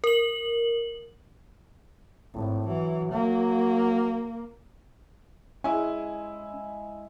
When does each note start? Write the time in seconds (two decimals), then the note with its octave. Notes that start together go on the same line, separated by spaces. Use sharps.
0.04 A#4 F#7
2.34 G#1 A2
2.68 E3 F#3
3.13 F#3 A#3
5.64 G#3 C#4 E4 G#5